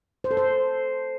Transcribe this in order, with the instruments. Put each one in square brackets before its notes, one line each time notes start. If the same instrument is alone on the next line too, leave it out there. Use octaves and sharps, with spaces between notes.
[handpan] C5
A4
C5